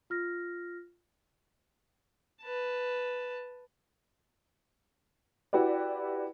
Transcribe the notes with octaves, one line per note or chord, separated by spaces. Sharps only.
F4 F6 A#6
B4 A5
E4 F#4 G4 B4 D5